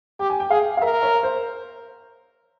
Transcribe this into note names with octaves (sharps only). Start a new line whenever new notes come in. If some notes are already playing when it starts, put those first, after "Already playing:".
G4 G5
G#5
G5
G#4 F5
F5
A#4 E5
C#5
C5